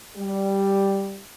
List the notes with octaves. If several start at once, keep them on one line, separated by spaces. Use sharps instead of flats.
G3